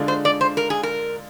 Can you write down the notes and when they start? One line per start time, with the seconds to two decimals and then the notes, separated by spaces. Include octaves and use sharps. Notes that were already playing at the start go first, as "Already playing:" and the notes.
Already playing: D3 G#3 D4 F4
0.08 C5
0.25 D5
0.41 C5
0.57 A#4
0.70 G#4
0.83 A#4